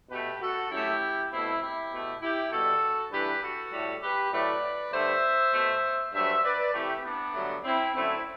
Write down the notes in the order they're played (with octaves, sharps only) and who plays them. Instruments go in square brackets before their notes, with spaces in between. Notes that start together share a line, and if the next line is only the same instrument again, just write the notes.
[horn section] B2 A3 G4 B4
F#4 A4
F#2 F#3 A3 E4 G4
B2 A3 C4 E4
E4 G4
B2 A3
E4 G4
B2 G3 F#4 A4
G2 E3 A3 G4 B4
F#4 A4
A2 G3
G4 B4
A2 F#3 A3 B4 D5
G2 D3 A3 C5 E5
B2 A3
G2 F#3 A3 C5 E5
B4 D5
C3 E3 A3 E4 G4
B3 D4
G2 D3 F#3 A3
C4 E4
F#2 D3 A3 C4 E4